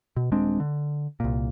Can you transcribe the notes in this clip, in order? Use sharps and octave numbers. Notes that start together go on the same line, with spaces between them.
B2
D#1 G#3 C4 D4
D3
C2 A#2